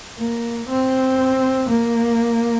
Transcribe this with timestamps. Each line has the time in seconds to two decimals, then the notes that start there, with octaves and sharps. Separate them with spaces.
0.19 A#3
0.70 C4
1.70 A#3